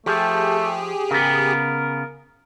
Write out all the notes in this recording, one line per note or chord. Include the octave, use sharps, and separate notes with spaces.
F3 A3 G4 G#4
C#3 B3 A#4